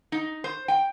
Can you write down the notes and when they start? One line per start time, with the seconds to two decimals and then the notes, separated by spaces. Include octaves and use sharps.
0.12 D#4
0.44 C5
0.68 G5